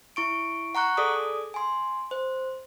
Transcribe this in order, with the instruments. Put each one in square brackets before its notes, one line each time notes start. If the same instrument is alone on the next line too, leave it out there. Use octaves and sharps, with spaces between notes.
[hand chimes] E4 C#6 D7
F#5 A#5 C#6 F#6
G#4 A4 D5 D6 D#6
G#5 C6
C5